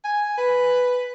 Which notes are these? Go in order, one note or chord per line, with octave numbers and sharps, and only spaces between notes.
G#5
B4